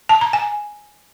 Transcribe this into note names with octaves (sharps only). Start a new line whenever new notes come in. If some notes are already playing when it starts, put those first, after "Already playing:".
A5
A#5
G#5